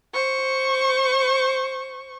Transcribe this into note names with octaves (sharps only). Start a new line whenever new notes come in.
C5 C#6